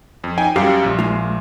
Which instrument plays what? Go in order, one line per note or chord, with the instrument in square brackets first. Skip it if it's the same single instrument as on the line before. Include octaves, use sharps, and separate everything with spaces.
[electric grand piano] F2
D#4 G5 G#5
[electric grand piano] F#2 G3 [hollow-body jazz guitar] G4 F5
[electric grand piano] A#1 A#2
[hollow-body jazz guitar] G#3 F4